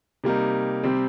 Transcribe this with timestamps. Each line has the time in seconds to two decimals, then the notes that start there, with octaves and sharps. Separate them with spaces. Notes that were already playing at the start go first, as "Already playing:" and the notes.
0.24 C3 G3 A#3 D#4
0.83 C3 G3 C4